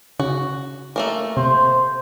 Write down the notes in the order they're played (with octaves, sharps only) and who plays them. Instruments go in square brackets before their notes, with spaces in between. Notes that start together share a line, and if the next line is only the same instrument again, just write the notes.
[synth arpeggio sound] C#3 [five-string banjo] F#4
[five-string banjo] A3 A#3 A#4
[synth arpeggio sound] C3 [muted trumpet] C5